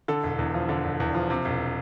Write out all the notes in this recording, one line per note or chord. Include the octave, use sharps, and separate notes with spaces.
D3 A4
E1
E2
F3
D3
E1
E2
F3
C3
E1